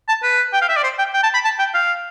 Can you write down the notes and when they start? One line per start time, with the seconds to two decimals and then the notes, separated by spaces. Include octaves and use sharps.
0.08 A5
0.23 B4
0.53 G5
0.61 F5
0.69 E5
0.76 D5
0.83 C5
0.99 G5
1.14 G5
1.23 A5
1.34 B5
1.44 A5
1.59 G5
1.74 F5